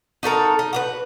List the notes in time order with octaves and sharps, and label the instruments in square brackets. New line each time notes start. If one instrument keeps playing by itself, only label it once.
[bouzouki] D#4 F#4 A4 A#4
D#4
F#4 G4 B4